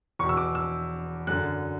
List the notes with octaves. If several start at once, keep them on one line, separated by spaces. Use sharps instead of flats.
E2 B2 C#6
E6
D6
E6
F#2 D3 F#6